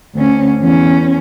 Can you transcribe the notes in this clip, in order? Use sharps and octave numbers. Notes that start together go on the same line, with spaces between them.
D2 C#4
E2 C#4